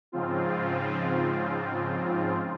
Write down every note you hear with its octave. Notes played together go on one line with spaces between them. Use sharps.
G#2 C#3 F3 C4 F4